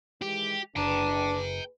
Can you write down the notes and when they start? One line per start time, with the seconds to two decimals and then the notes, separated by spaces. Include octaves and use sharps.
0.22 D#3 E3 G#3 G4
0.76 F#1 A#3 D4 G#4 B4 G5 A#5